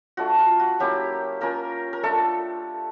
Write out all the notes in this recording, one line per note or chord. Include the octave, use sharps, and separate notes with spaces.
A3 D4 F4 F#4
F4
F#4
F#3 A#3 C#4 E4 G4
A#3 C#4 F4 A#4
A#4
A3 D4 F4 A4